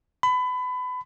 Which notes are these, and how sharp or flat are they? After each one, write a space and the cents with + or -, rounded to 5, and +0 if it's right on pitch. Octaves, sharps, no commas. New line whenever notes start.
B5 +25